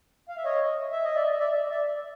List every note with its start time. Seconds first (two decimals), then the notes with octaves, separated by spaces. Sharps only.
0.29 F5
0.37 E5
0.45 C#5 D#5
0.92 E5
1.04 D#5
1.16 D5 E5
1.39 D5 E5
1.71 D5 E5